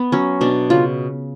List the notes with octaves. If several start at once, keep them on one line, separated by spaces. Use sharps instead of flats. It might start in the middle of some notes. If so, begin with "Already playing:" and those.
Already playing: B3
F#3 C#4
B2 D4
C#3 F4